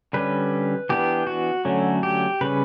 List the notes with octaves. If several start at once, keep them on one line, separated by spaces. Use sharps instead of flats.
D3 G3 C#4 B4
E3 B3 D4 G4
F#4
D3 F#3 A3 C#4
G4
C#3 G3 C#4 B4